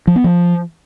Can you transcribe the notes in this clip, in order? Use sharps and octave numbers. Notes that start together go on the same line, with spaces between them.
F3
B3
F3